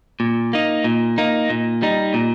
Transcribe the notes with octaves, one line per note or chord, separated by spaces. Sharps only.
A#2
A#3 D#4
A#2
A#3 D#4
A#2
G3 D#4
A#2